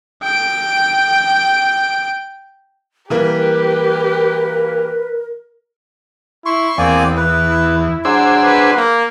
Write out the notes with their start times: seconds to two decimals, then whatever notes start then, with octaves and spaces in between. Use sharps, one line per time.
0.23 G5 D7
3.10 E3 G3 A#3 G4 A#4 B4
6.46 E4 C6 C#6
6.78 E2 A#3 C4 D5 G#5
7.17 E4 B4
8.05 F#3 D4 G#4 C5 E6
8.44 B4
8.76 A#3